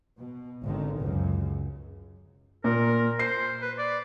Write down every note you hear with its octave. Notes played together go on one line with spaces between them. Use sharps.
B2
G#1 D3 D#3
C#2 F#2 C#3
A#2 A#4
C5 C7
B4
D5